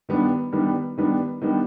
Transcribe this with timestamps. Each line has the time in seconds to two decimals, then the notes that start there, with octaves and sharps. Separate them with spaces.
0.09 D#3 G3 B3 D4
0.52 D#3 G3 B3 D4
0.98 D#3 G3 B3 D4
1.41 D#3 G3 B3 D4